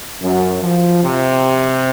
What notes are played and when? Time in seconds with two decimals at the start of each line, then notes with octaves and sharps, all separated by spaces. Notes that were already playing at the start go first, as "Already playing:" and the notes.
0.22 F#2
0.62 F3
1.02 C3